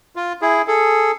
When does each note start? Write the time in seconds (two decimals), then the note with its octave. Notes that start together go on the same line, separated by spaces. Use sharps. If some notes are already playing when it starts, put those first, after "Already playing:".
0.16 F4
0.42 E4 G#4
0.67 G#4 A4